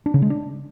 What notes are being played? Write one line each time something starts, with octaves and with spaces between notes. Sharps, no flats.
D4
C#3
G#3
D4